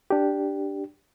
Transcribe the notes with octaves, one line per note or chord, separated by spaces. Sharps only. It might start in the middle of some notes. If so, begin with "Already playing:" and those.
D4 G4